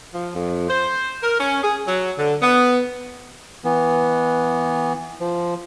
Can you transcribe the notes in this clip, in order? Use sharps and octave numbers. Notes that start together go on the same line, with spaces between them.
F3
F2
C5
A#4
C#4
G#4
F#3
D3
B3
E3 B3
F3